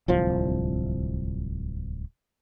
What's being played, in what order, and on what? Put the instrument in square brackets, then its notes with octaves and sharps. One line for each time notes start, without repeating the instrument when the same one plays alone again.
[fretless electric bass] D1 C2 F3